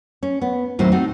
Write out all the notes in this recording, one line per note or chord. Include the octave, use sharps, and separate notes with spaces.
C#4
B3
D#2 A2 F#3 C4 C5
C4 D#4 F#4 A4